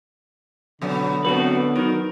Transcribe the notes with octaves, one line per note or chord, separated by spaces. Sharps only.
B2 D3 F#3 B3
F#3 A3 B3 C4 F#4 B4
D#3 F#3 A#4